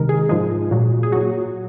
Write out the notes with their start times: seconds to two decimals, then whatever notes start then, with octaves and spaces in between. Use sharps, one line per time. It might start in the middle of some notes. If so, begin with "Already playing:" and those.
Already playing: C3 D#3 G#3 A#4
0.09 G#4
0.29 G#2 F3 G#3 G#4
0.71 A#2 F#3
1.03 G#4
1.12 A#2 F#3 F#4